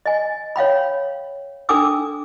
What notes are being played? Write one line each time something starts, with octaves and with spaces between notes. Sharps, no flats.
D#5 G#5
C#5 F5 G5 B5
D4 A4 G5 G#5 D6 E6